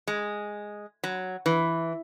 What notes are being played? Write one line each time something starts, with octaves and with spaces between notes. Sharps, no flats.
G#3
F#3
E3